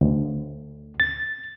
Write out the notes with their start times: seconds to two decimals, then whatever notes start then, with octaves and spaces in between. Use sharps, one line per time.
0.01 D2
1.00 A6